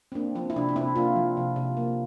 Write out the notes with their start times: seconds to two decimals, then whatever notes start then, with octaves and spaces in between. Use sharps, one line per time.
0.12 C4
0.15 A#3 D4
0.35 F3 C4
0.50 E4
0.56 C3 D4
0.69 D4
0.76 C3 C4 E4
0.96 A#3 D4 F4
1.16 F3
1.37 C3
1.56 C3
1.77 A#3